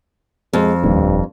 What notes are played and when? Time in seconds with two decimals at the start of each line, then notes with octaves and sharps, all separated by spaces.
0.53 F2 G#3
0.84 D#1 G2